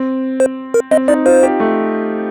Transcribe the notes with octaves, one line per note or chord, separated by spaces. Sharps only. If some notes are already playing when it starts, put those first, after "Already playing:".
Already playing: C4
C5
A#4
C4 D#5
D#4 D5
F4 C5
G4
A3